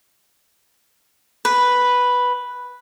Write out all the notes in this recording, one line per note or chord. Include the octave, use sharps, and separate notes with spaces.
B4